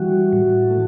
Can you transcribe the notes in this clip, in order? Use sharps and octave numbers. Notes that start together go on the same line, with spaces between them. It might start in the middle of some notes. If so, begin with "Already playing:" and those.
Already playing: E3 G3 F#4
A2
A3